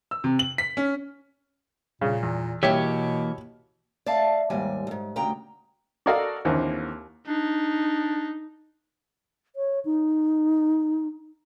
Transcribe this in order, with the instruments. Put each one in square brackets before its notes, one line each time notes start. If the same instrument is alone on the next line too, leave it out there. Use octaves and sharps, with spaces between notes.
[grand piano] E6
C3
F#7
B6
C#4
[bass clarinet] A#2 [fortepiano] C#3
[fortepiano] E2
[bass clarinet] B2 [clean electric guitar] E3 A#3 [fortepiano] G4 C#5 E5
[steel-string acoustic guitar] D5 E5 F5 A5
D#2 G#2 G3 G#5
D2 G#2
D2 C#3 G5 A#5
[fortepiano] F#4 A4 A#4 D5 D#5 F5
D#2 D3 E3 A#3 C4
[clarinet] D4 [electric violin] D#4
[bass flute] C#5
D#4